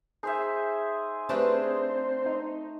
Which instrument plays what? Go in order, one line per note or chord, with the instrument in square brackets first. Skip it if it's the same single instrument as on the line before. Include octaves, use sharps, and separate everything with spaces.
[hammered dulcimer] D#4 C5 E5 [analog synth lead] G#4
[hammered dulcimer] A3 [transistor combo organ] C4 C5 [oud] D4 G4 B4
[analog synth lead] D#4